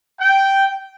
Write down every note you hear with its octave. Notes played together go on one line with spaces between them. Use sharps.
G5